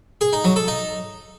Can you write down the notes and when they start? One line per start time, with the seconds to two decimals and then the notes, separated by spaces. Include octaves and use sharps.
0.21 G#4
0.33 D#4
0.44 F#3
0.56 A4
0.68 D#4